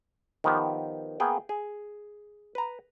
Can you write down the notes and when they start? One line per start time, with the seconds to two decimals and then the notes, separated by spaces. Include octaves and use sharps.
0.44 D#3 F3 B3 G4
1.20 A#3 B3 G#4 G5
1.49 G#4
2.55 B4 A#5